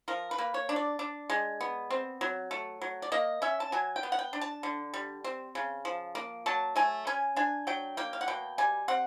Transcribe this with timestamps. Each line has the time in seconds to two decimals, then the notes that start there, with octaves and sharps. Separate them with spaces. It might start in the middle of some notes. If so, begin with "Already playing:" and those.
0.08 F3 A#4
0.31 B4
0.38 A#3
0.54 C#5
0.69 D4
0.76 D5
0.99 D4
1.30 G#3
1.61 B3
1.90 C4
2.21 F#3
2.51 A3
2.82 F#3
3.02 D5
3.12 A#3 D#5
3.42 C#4 E5
3.60 A5
3.72 F#3 G#5
3.96 G5
4.03 B3
4.12 F#5
4.19 G5
4.33 D4
4.41 A5
4.63 D3
4.94 G3
5.24 C4
5.55 C#3
5.85 F3
6.15 A#3
6.46 F#3 A5
6.76 A3 G#5
7.07 C#4 G#5
7.36 D4 G#5
7.67 F#3 G5
7.97 A#3 G5
8.13 F5
8.21 F#5
8.28 B2 G5
8.58 G3 G#5
8.88 C4 F#5